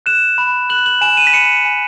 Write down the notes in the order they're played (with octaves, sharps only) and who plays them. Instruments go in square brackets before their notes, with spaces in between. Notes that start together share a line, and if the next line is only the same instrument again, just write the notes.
[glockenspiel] F#6 E7
B5
F#6 F#7
F#7
G#5 E7
D#7
B6
B5 C#7
G#5